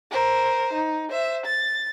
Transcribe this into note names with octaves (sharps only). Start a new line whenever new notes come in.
A#4 C5
D#4
C5 E5
A6